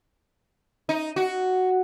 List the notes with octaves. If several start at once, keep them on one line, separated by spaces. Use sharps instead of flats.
D#4
F#4